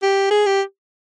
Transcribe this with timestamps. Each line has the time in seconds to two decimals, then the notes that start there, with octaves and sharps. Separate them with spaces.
0.02 G4
0.31 G#4
0.46 G4